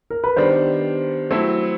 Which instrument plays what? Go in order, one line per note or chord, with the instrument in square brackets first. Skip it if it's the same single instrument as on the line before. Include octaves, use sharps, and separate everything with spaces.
[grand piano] A#4
B4
[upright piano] D#3 G3 B3 D4 [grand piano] C5
[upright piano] F#3 A3 C4 E4